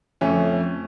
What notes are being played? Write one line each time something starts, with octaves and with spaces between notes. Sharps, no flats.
F2 A3 C#4